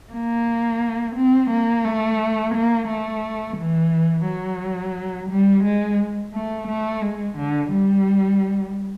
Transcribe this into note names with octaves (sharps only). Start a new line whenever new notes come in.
A#3
C4
A#3
A3
A#3
A3
E3
F#3
G3
G#3
A3
A3
G#3
D3
G3